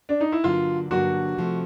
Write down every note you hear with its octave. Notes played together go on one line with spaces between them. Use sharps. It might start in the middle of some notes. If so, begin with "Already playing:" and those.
D4
D#4
E4
G2 D3 F#3 A#3 D4 F4
G2 D3 F#3 A#3 D4 F#4
C3 F3 A3